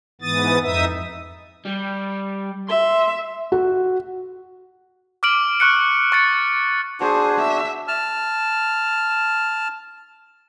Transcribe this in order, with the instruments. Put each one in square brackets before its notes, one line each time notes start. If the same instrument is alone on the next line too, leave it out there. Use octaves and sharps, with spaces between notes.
[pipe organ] G#2 E3 B3 D#6 A6
F2 D#4 E5 D#6
[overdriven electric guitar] G3
[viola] E5 [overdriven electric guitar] C6
[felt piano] F#4
[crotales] D6 F6 D7 F#7
C#6 F#6 C#7
C#6 A6 C#7
[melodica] D4 F#4 [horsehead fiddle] G#4 C5
[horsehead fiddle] E5
[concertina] A5 F6